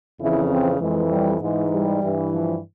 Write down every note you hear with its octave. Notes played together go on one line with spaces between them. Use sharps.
F2 C#3 E3 E4
C4
F2 E3 G#3
G3
G#2 E3 G#3
G3
G2 E3
F3